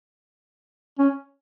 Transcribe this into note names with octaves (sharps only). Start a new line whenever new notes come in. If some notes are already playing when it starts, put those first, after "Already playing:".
C#4